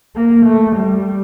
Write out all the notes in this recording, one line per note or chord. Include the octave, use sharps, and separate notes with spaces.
A#3
A3
G3